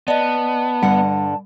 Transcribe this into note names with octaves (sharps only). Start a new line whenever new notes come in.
B3 D5 D#5 A5
G2 D3 G3 F#5